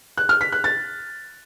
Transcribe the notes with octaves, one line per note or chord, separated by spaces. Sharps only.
F#6
F6
B6
F#6
A6